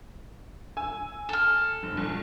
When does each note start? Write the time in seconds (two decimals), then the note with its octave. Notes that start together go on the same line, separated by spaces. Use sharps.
0.77 G#5 E6
1.29 A4 F6
1.83 F1
1.97 A#1